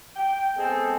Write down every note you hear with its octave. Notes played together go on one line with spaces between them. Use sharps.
G5
G#3 B3 C4 G#4 A4